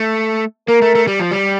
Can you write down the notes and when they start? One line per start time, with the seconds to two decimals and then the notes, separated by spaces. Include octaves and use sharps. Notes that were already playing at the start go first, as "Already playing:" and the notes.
Already playing: A3
0.68 A#3 A#4
0.82 A3
0.95 A3
1.07 G3
1.20 F3
1.31 G3